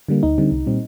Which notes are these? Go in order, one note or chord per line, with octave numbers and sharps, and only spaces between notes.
D3 G3 A#3
D2 D#4
D3 G3 C4
C2
A#2 G3 C4